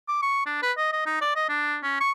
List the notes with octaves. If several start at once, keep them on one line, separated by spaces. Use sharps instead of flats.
D6
C#6
D4
B4
D#5
D#5
D#4
D5
D#5
D4
C#4
C#6